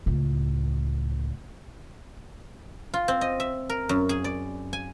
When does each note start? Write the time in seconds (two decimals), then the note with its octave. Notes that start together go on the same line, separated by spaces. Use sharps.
0.06 C#2 A2
2.94 F4
3.08 C4
3.21 D#5
3.40 E5
3.69 A#4
3.89 F#2
4.09 G#4
4.24 D5
4.73 G#5